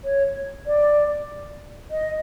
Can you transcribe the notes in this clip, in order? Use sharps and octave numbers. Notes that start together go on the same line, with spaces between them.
C#5
D5
D#5